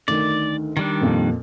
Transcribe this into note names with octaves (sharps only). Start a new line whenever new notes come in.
D2 D#3 D5
D#3 G3 D4
F2 A#2